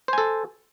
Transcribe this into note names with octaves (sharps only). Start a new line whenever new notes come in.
A4 C5 G#5